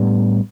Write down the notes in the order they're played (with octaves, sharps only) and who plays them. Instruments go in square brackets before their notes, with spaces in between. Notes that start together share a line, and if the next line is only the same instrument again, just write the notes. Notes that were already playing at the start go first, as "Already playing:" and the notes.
Already playing: [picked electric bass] A2 G3 B3 D4